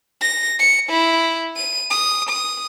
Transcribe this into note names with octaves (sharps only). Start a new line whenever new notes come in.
A#6
C#7
E4
D#7
D#6
D#6